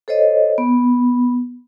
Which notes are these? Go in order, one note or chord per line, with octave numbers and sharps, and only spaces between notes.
A4 C5 C#5 D#5
B3